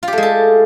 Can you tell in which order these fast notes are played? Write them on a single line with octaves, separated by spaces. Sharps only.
F4 G4 A3 G#3 A4